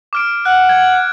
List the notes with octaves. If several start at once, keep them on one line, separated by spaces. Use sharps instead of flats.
D6 F6 D7
F#5 F#6
G#6